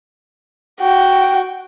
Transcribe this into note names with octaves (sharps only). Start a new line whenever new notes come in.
F#4 G5